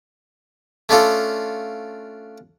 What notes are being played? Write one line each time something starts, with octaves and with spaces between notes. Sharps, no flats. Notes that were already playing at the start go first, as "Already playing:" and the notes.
A3 C#4 D4 F4 A4